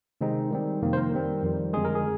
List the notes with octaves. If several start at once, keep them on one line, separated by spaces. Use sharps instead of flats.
C3 D#3 G#3 C4 D#4
D#3 G3 C4
F2 C3 D#3 A#3
C5
A#4
D#3 G3 C4
F2 D#3 G3
F2 D3 G#3 G#4
A#4
G#4